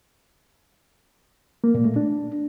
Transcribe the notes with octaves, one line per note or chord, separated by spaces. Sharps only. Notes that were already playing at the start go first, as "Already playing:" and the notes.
A#3
A#2
A3
D4